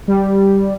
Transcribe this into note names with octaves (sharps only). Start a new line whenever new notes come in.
G3